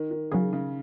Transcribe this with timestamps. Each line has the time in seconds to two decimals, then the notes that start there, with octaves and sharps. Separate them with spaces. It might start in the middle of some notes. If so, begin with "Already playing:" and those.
Already playing: D#3
0.11 D#3
0.32 C#3 F#3 C#4 G#4
0.53 C#3